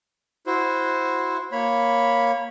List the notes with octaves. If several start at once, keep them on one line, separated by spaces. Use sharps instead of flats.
E4 F#4 C5
A#3 C#5 B5